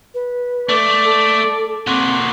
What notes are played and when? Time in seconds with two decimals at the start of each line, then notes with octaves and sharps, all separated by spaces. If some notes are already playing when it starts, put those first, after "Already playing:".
0.14 B4
0.69 A3 D5
1.05 A4
1.87 A#2 C4 F#4